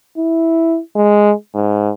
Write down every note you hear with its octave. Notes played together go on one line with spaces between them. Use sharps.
E4
G#3
G#2